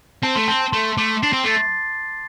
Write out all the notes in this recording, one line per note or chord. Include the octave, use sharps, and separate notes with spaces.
C4 A5
A3 C6
C4 A5
A5
A3 C6
A3 D6
D4 C7
C4
A3 A6